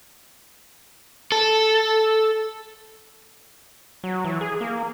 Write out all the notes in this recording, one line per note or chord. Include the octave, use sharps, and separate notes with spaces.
A4
F#3
E3
G#4
A#3